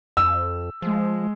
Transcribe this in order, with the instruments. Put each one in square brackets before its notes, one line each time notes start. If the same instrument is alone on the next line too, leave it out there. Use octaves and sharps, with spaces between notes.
[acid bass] F2 [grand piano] E6
[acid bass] F3 [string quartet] G#3